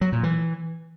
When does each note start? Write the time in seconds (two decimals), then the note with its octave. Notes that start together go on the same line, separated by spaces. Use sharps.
0.01 F#3
0.12 A#2
0.23 E3